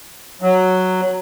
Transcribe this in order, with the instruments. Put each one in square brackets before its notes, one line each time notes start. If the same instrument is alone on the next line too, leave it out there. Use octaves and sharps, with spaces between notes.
[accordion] F#3